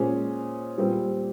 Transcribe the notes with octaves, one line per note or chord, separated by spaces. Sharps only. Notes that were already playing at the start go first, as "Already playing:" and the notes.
Already playing: A#2 G#3 C#4 G#4 C5
A#2 G3 C4